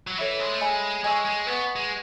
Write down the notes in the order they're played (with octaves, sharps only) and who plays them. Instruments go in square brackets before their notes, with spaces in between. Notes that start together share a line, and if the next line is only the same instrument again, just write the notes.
[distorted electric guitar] F#3
[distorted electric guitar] E3 [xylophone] A4 C#5 E5 B5
[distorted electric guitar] G#3
A3
[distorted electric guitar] G#3 [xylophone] D#5 G#5 B5 E6
[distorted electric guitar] G#3 [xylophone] D#5 G#5 C#6 E6
[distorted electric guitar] G#3
[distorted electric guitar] B3 [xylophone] B4 F#5 C#6
[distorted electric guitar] G#3